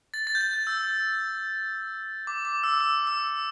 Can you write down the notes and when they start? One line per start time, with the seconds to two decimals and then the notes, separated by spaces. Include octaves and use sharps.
0.14 A6
0.27 A6
0.35 G6
0.41 A6
0.54 G6
0.67 E6
2.27 D6
2.45 D6
2.64 E6
2.81 E6
3.07 E6